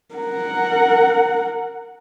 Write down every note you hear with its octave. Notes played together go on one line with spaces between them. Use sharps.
A#4 F#5